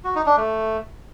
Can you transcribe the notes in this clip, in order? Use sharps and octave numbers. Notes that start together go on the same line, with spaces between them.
F#4
D#4
D4
A3